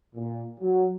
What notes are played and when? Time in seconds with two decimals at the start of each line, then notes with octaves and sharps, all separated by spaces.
0.16 A#2
0.60 F#3